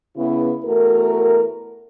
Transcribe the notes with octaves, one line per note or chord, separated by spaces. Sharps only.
C#3 B3 E4
E2 A3 F#4 A#4